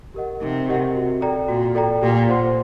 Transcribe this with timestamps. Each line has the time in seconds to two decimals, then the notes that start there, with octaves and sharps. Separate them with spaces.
0.14 G4 A#4 D#5 F#5
0.41 C3 D#4
0.68 G4 A#4 D#5 F#5
0.95 F#4
1.21 A4 D5 G5 A#5
1.48 A#2 F#4
1.75 A4 D5 G5 A#5
2.01 A#2 G4
2.29 C5 F#5 C6